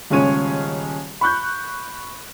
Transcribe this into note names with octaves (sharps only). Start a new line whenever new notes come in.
D#1 C#3 G#3 C#4 C#5 D#7
B5 C#6 F#6 G6